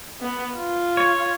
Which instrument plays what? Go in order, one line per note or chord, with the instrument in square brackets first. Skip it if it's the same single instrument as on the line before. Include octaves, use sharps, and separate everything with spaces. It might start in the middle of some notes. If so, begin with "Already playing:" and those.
[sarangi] B3
F4
[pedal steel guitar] C#5